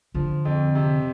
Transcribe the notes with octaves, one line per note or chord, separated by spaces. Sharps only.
D3 F3
F2
C3